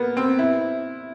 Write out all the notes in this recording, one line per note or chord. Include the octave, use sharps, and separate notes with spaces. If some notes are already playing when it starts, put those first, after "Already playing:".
Already playing: A#3 B3
C4
E4